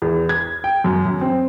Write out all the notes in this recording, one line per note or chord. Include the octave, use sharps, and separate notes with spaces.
E2
G#6
G5
F#2
F#2
C4